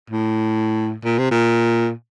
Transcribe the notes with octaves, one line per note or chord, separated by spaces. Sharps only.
A2
A#2
C3
A#2